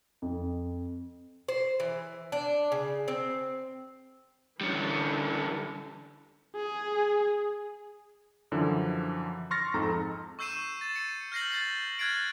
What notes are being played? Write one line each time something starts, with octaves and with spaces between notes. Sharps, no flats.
F2
C5
E3
D4
C#3
C4
D3 E3 G3 C#4
G#4
F#2 D3 E3 F3
C6 C#6 F6 A6 A#6
F2 G#2 D#4 A4 A#5
C#6 E6 G6 C7 D#7 E7
A6 E7
C#7
F6 G6 A#6 C7 F#7
G6 A6 C7
F6 F#6 G#6 A6 C7 D7